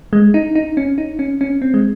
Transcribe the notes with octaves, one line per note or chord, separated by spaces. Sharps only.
G#3
D#4
D#4
C#4
D#4
C#4
C#4
C4
G#3